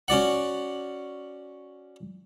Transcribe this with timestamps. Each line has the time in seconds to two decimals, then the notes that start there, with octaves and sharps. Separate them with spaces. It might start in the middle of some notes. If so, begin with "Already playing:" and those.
0.08 C#4 F#4 D5 F#5